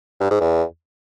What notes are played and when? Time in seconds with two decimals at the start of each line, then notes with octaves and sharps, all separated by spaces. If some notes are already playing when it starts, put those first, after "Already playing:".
0.20 G2
0.30 G#2
0.40 E2